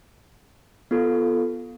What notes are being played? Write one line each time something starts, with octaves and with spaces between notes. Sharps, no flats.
B3 F4 A4